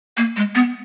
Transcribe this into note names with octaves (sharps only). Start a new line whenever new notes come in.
A#3
G#3
B3